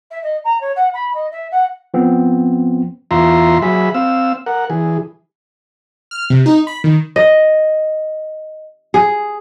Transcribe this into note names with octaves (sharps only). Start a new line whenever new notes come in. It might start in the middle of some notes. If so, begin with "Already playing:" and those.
E5
D#5
A#5
C#5
F#5
B5
D#5
E5
F#5
F3 B3 C4
E2 F4 E5 A#5 C6
F#3 G#4 E5 B5
C4 F5 E6
A#4 F#5
E3 G#4
F6
C3
D#4
B5
D#3
D#5
G#4